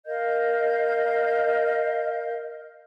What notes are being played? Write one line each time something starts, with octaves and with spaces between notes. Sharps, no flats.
A#4 D#5 F5 G6